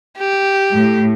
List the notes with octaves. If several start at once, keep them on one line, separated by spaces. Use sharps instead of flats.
G4
A2